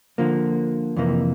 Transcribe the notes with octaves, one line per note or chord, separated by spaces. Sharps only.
D3 F3 A#3
F2 C3 E3 A#3